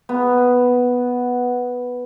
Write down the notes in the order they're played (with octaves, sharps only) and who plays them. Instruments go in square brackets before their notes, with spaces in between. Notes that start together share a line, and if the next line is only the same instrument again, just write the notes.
[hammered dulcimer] B3